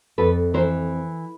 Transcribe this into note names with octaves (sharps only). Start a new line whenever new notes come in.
F2 A4 B4
E3 A#4 C5